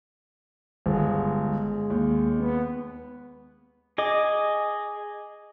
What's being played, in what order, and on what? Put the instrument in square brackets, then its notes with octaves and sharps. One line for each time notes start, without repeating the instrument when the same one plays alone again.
[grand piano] G1 [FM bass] G#3
[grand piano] D#2
[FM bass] B3
[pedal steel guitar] G#4 D#5 D6